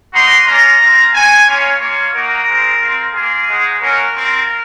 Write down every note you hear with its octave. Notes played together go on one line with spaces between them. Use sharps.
A#3 D#4 F#4 C6
A#3 C#4 F4 A#5
C4 F4
C4 F#4 G#5
A#3 C#4 F4 C#5
A#3 F4 C#5
A#3 D#4 F#4 A#4
G#3 C4 F4
C4 F4
A#3 F4 G#4
G#3 D#4 F#4
A#3 C#4 F#4 A#4
C4 F4